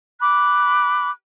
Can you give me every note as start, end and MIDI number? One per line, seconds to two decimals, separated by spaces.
0.21 1.10 83
0.21 1.10 86
0.21 1.10 90